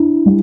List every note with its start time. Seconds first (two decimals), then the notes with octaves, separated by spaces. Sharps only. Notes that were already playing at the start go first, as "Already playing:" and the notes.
Already playing: D4 E4
0.26 G3